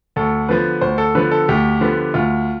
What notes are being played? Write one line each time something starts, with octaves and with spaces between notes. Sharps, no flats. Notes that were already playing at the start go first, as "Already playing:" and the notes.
D2 A4
D3 F3 B3 B4
D2 C5
A4
D3 F3 B3 B4
A4
D2 G4
D3 F3 B3
D2 F4